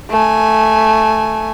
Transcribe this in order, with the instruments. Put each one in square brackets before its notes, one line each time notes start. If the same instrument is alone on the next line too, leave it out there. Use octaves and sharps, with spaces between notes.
[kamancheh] A3 G#5